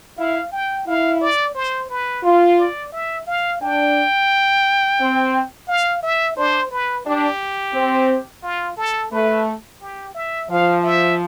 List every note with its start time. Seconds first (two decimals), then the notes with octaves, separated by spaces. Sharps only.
0.17 E4 F5
0.52 G5
0.87 E4 F5
1.21 D5
1.55 C5
1.90 B4
2.24 F4
2.58 D5
2.92 E5
3.27 F5
3.62 D4 G5
5.00 C4
5.68 F5
6.03 E5
6.37 D4 C5
6.71 B4
7.06 D4 G4
7.74 C4
8.43 F4
8.77 A4
9.11 A3 B4
9.81 G4
10.14 E5
10.50 F3 F5
10.83 E5